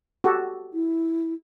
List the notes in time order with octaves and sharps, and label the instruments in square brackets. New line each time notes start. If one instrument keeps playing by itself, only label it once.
[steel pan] F#4 G4 A4
[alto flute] E4